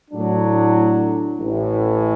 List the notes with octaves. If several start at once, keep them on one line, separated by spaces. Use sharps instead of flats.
A2 F#3 D4
A1 A2 E3